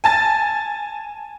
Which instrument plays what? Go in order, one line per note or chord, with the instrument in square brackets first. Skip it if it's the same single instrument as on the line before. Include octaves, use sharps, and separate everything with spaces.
[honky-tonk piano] G#5 A5 A6